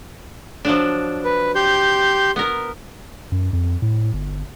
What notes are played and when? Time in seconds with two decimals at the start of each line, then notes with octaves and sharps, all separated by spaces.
0.65 F3 F#3 D4
1.24 B4
1.55 G4 C6 G6
2.36 B3 A#4
3.32 F#2
3.53 F2
3.82 A2
4.13 G1